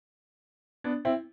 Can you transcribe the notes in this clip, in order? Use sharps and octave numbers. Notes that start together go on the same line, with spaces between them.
B3 D4
C4 E4